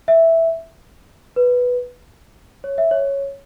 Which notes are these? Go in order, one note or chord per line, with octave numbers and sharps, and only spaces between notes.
E5
B4
C#5
E5
C#5